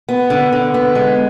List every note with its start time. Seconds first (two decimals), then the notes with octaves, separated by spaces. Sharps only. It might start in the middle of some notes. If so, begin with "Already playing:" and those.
0.09 B3
0.30 D3
0.53 D3
0.74 B3
0.95 G#3